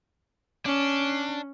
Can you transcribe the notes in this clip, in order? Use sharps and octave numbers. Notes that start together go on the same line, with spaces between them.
C#4 D4